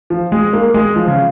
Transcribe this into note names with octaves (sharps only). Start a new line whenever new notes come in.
F3
G#3
A#3
G#3
F3
C#3